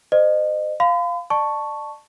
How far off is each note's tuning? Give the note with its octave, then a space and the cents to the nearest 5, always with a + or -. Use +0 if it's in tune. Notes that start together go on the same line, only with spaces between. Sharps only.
C5 -35 D#5 -30
F5 +0 B5 +45
D5 +35 A5 +0 C#6 +0